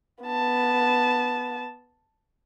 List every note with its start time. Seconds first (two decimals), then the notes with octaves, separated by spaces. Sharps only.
0.24 B3 A5